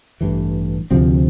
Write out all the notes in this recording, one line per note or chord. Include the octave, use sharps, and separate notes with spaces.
A1 G2 E3
D2 C3 F3 C4